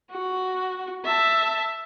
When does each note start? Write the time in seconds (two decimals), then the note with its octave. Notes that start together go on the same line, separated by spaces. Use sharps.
0.11 F#4
1.05 E5 A5